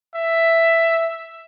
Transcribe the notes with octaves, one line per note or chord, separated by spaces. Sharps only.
E5